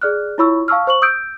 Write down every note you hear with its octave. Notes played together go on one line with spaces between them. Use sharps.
G#4 D5 F6 F#6
E4 F4 C#5 B5 C#6 E6
F5 A5 C#6 E6 F6
C5 C#6 F#7
D#6 E6 G6 D7